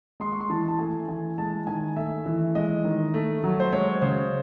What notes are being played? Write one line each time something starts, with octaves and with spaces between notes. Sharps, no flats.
G#3 C6
C#6
C6
E3 A5
A5
A3 G#5
E3 G#5
G#3 A5
D#3 G#5
A3 E5
E3
G#3 D#5
D#3
A3
F#3
C5
G#3 C#5
C#3 C5